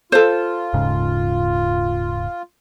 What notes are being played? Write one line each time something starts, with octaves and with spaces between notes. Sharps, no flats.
F4 A4 C5
D#1 G#2 C#3